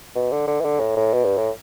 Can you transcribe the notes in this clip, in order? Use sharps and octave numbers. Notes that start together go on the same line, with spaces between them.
B2
D3
D3
E3
D3
A2
A2
B2
G2
A2